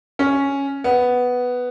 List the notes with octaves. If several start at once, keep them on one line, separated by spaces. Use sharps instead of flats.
C#4
B3